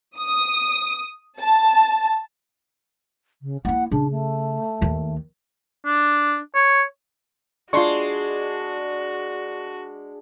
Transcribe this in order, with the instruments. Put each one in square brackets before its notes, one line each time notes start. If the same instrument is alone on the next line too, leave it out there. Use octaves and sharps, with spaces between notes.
[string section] D#6
A5
[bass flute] C#3
[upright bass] A#3 E4 [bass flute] F#5
[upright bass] C#3 [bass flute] D4
[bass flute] A3
[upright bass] D#2 D#3
[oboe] D4
C#5
[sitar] G#3 [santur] D4 [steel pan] F4 C6 C#6 [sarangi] F#4